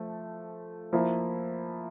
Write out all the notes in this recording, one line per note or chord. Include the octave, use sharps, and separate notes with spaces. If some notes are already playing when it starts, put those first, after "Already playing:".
Already playing: F3 A3
F3 A#3 E4